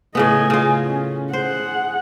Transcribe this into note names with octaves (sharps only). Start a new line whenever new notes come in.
A2 C#3 B3 D#5 G#5
C#3 F4
C#4
G#4 C5 F#5